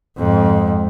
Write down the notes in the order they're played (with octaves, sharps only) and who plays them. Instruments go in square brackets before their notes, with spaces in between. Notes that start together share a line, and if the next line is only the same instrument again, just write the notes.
[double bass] F2 G#2